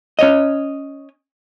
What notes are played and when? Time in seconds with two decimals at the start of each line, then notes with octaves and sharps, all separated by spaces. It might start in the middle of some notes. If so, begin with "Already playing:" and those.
0.19 C#4 C#5 D#5